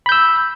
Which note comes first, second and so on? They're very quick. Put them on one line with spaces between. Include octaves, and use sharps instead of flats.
B5 G6 E6